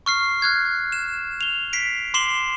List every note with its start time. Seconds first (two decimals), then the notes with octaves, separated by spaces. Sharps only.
0.06 C#6 F6 C7
0.42 F6 F#6 G#6
0.92 E7
1.41 F7 G7
1.73 B6 C7 D7
2.14 C6 D6 C7 E7 F#7 G7